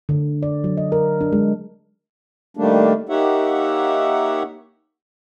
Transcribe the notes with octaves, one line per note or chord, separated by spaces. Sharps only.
D3
D5
F#3
D#5
A#4
D4
G#3
D#3 G3 A3 A#3 D4
A#3 D#4 G4 C#5 E5 F#5